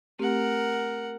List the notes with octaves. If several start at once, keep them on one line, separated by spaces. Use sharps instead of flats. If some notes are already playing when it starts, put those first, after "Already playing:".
A3 C4 G4 A#4 F#5